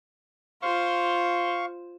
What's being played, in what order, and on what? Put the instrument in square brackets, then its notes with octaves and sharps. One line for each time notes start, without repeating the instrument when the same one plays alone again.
[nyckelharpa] F4 C5 [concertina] F5 C#6